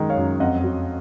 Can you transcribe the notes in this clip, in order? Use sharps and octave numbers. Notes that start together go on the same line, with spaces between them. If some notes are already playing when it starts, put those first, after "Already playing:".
Already playing: F#2 D#3 G#3
C#5 F5
F#2
F2 D#5 F#5
F#3